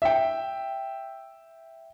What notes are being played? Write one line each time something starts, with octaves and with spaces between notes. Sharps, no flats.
E5 G5